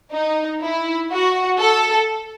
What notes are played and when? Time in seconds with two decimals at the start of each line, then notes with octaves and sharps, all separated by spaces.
0.12 D#4
0.62 E4
1.11 F#4
1.60 A4